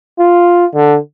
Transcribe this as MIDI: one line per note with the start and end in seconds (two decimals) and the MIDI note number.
0.19 0.65 65
0.74 0.97 50